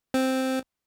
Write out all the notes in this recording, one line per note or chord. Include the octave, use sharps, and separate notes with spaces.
C4